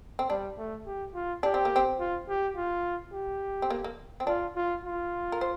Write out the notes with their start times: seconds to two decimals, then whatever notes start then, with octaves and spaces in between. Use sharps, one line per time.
0.19 C4
0.29 G3 D4
0.58 A3
0.86 G4
1.14 F4
1.43 D4 G4
1.54 C4
1.65 A#3
1.76 C4
1.99 F4
2.29 G4
2.56 F4
3.13 G4
3.62 C4
3.70 A#3
3.84 A#3
4.20 C4
4.27 D4 F4
4.56 F4
4.84 F4
5.32 A#4
5.41 C5